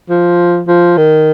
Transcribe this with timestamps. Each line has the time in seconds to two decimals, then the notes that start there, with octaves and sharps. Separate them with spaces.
0.10 F3
0.68 F3
0.97 D#3